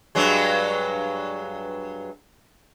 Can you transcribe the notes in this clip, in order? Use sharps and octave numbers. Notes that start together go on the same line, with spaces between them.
G2 F#3 G#3